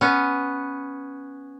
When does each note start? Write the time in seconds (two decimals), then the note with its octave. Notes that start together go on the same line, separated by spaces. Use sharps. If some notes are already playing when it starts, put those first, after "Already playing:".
0.01 B3 C#4